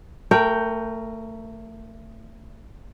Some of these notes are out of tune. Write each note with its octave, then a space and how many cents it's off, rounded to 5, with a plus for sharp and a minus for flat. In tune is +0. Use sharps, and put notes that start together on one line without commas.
A3 +25 A#4 +0 G5 +0